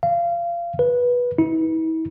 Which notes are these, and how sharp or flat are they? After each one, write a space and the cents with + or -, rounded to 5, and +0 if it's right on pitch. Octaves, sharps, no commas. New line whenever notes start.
F5 -25
B4 -15
E4 -40